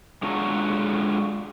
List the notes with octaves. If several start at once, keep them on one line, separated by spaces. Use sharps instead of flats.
G#3 D4 F4 F#4 C#5 A#5